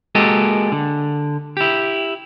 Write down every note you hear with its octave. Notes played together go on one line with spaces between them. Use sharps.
G#3 A#3 F#4 G4 A4 D#5
D3
E4 G4